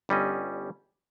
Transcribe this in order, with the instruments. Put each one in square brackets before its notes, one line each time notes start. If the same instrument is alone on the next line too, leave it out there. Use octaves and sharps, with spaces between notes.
[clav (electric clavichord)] G1 G3 C#4 D#5